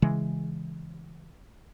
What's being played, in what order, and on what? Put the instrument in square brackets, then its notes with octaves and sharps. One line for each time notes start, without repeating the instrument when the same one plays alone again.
[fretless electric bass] C#3 E3 G#3